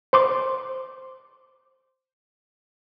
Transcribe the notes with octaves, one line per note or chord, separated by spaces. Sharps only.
C5 C6 D6